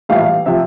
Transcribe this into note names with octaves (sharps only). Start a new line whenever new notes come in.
A#1 A2 E3 G3 F5
C3 F3 E5